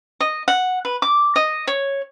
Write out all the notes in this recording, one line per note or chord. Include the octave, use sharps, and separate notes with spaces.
D#5
F#5
B4
D6
D#5
C#5